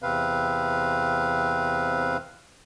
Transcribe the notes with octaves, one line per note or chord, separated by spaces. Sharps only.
E2 C3 C4 B4 F5